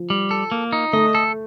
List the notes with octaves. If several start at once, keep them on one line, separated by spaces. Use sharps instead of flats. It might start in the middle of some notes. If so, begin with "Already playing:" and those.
Already playing: F3
G3
A4
A#3
D#4
A3 D#5
A4